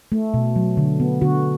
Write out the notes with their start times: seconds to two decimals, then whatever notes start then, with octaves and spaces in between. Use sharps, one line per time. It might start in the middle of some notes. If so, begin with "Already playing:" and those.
0.12 A3
0.34 B2
0.56 F#3
0.77 D3
1.00 B3
1.21 D3 F#4